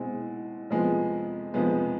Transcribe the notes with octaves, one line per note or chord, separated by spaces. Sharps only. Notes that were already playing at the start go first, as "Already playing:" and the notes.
Already playing: B2 G#3 C4 E4
F2 C3 F3 G#3 B3
F2 C3 F3 G#3 B3